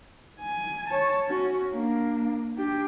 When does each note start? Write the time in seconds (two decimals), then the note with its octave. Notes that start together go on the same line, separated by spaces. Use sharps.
0.40 G#5
0.89 C#5 A5
1.27 C#4 F#4
1.73 A#3 D4
2.56 D4 G4